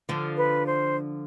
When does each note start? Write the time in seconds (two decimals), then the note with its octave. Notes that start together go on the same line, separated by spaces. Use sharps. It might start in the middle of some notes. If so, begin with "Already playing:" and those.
0.09 D3 F3
0.37 B4
0.66 C5